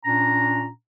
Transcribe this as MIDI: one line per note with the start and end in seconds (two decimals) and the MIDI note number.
0.05 0.68 46
0.05 0.68 61
0.05 0.68 62
0.05 0.68 82